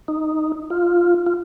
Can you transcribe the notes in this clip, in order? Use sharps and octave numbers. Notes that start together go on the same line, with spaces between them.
D#4
F4
F4